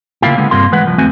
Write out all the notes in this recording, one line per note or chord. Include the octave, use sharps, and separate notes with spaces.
C#3 A#3 E4 F4 G4
D3 G#3 B3
G2 C3 A#3 F4 C6
E3 G#3 B4 F#5
C2 F3
D#2 A3 C4 F#4 G#5